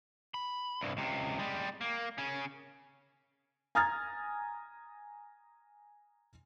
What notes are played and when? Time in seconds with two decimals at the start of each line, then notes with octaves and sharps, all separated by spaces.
0.34 B5
0.81 C2 G2
0.97 C#2 C3
1.39 G3 G#3
1.81 A#3
2.18 C#3 C#4
3.75 G#5 A#5 D#6 F6 G#6 A6